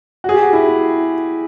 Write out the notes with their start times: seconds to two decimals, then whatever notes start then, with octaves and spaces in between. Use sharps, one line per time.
0.24 F#4
0.29 G#4
0.34 G4
0.43 F#4
0.53 E4